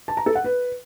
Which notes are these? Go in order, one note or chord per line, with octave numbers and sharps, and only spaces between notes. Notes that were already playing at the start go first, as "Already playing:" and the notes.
A5
A#5
A4
F#5
B4